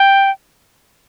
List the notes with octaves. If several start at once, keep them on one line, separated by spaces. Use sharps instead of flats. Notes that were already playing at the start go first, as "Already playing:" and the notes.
Already playing: G5